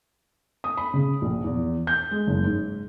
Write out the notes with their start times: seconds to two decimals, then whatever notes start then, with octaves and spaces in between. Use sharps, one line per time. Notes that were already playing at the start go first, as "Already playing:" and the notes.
0.64 D#6
0.77 B5
0.94 C#3
1.22 A#1
1.44 E2
1.87 G6
2.11 G#3
2.27 F#1
2.44 G#2